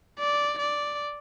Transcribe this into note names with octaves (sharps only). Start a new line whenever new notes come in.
D5
D5